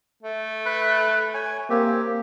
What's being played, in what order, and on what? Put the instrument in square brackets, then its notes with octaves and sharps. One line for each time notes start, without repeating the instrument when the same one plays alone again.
[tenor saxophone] A3
[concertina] B4 B5 F#6
C#5 G#5
[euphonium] A#3 [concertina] C4 G4